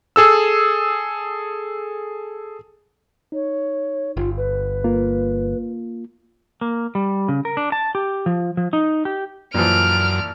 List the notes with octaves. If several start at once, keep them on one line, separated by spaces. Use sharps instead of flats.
G#4 A4 E6
D#4 C#5
G1 F4
B4
A#3 F4
A#3
G3
C#3
A#4
D4
A5
G4
F3
F3
D#4
G4
F#2 A#2 E3 F3 F6 D7